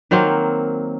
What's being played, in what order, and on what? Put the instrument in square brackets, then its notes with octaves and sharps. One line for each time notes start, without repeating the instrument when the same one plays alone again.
[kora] D#3 F#3 A#3 C4